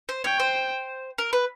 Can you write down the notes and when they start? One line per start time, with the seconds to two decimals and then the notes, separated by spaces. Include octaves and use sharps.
0.09 C5
0.24 C#5 G5
0.40 C5
1.18 A#4
1.33 B4